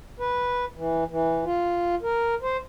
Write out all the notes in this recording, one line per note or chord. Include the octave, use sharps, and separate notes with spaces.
B4
E3
E3
F4
A#4
C5